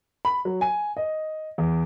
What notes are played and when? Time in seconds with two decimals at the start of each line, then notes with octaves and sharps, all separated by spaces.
0.25 B5
0.45 F#3
0.61 G#5
0.97 D#5
1.58 E2